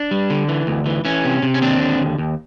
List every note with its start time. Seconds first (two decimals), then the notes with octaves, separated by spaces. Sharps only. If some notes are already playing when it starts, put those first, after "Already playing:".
Already playing: D4
0.11 G3
0.30 D3
0.48 E3
0.67 D2
0.86 E3
1.05 E3 C#4
1.25 C3
1.42 C3
1.54 C#4
1.61 D#2 C4 D4
1.81 D3
2.00 D#2
2.18 D#2